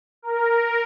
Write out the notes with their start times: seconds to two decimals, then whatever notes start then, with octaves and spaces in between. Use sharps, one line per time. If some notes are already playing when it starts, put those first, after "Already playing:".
0.22 A#4